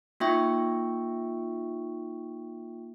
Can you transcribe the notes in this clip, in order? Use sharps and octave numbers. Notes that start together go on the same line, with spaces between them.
A#3 D#4 F4 E5 G5 C#6